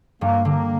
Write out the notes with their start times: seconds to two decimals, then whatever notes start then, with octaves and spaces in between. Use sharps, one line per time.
0.21 G2 G3 A#3
0.45 D3 A#3